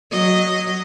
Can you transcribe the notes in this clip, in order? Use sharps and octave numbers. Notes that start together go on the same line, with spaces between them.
F#3 D#5